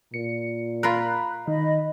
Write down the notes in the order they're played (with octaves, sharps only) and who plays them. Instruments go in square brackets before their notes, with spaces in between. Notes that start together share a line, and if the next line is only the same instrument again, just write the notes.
[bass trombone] A#2 [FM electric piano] C#7
[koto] F4 A#4 [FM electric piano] B5 F#6
[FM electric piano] D#3 [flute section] D#5 B5